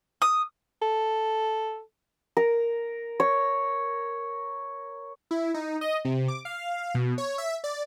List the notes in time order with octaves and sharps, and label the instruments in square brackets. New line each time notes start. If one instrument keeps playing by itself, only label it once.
[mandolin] D#6
[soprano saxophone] A4
[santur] A#4
C#5
[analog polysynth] E4
D#4
D#5
C3
D6
F5
B2
C#5
E5
D5